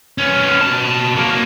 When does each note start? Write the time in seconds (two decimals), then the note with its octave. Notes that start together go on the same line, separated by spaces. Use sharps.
0.18 B3 C#4
0.60 B2 A5
1.15 F#3 A#3